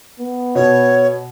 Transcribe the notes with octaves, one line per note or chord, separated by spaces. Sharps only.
B3
B2 C#5